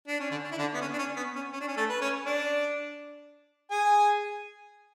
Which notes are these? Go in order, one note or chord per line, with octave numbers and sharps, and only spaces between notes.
D4
C#4
D3 D4
D4
E4
D3 D4
B3
C#4
D4
C#4
B3
C#4
C#4
D4
C#4
A3 A4
B4
C#4 C#5
D4 D5
G#4 G#5